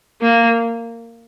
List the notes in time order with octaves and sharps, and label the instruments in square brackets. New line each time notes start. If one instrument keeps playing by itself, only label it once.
[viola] A#3